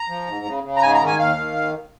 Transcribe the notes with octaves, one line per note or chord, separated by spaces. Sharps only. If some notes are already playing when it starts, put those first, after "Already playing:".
Already playing: A#5
F3
G#2
C#3
C#3
A#5
G#2 G#5
A#5
D#3
G#5
D#2 F5
D#3
D#2